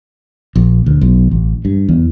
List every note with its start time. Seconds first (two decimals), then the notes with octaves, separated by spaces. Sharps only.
0.56 A#1
0.86 D2
1.01 B1
1.31 A1
1.65 G2
1.89 E2